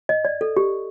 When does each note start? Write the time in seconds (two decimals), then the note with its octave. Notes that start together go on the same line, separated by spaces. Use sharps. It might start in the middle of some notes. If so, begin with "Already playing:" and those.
0.09 D#5
0.25 D5
0.41 A4
0.57 G4